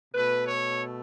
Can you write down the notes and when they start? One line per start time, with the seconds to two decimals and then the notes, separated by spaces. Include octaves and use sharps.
0.14 B2 A3 B4
0.47 C#5